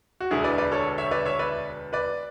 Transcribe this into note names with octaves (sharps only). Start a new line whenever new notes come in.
F#4
E1 D2 D3 E4 G#4
B4 D5
B4 D5
A4 C#5
C#5 E5
B4 D5
C#5 E5
B4 D5
B4 D5